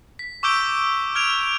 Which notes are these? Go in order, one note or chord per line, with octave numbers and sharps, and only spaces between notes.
B6
C#6 D6 E6 G6 D7 G7
F6 G#6 D7 E7 F7